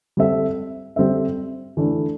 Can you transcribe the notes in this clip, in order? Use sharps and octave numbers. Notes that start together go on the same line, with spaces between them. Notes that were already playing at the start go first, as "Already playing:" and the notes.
G3 C4 A4 E5
G3 C4 A4 E5
E3 A3 D4 A4